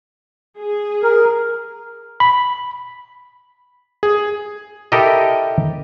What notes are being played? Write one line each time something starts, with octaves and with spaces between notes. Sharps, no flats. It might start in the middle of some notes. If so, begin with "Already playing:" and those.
G#4
A#4
B5
G#4
E4 G4 A4 A#4 D#5